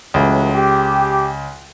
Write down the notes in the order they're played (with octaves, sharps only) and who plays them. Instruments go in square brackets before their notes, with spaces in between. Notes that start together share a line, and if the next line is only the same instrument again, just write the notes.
[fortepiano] C#2 [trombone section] A2 E3 F#3
[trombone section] G4